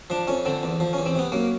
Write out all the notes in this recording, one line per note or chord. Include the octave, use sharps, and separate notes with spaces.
F3 D4
F2 C#4
D3 C4
E2
F3
C#4
E2
C4
C3 B3
F#2 A#3